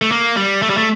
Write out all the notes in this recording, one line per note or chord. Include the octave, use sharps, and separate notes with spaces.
A3
A#3
G3
A3
G3
A3